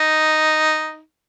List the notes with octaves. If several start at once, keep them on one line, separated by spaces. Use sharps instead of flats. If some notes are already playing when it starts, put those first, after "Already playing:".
Already playing: D#4